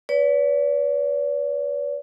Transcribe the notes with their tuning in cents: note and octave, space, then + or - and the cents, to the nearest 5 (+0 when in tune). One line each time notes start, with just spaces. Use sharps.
B4 +0 D5 -45